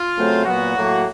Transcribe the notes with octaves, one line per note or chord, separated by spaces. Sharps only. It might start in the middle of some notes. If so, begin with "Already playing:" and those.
Already playing: F4
C#3 F#3 A3 C4
A#2 F#3 B3 F#4
A2 F#3 A#3